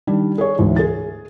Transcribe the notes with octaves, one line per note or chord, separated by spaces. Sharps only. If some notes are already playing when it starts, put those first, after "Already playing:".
D#3 G3 D4
G#4 C#5
D2 G#2 E3
G#4 A6